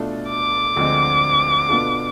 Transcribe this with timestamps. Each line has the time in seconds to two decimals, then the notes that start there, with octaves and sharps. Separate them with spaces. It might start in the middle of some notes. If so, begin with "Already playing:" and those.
Already playing: B2 A3 D4 F4 A4
0.29 D6
0.76 D2 D3 F3 G#3 C4
1.69 B2 B3 D4 F4 A4